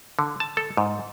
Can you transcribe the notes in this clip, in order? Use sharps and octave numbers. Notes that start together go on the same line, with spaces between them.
D3
A5
A4
G#2